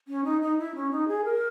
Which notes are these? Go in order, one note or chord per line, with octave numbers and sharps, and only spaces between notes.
C#4
D#4
D#4
E4
C#4
D#4
G#4
A#4